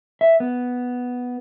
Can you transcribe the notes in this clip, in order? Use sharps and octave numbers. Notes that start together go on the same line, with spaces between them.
E5
B3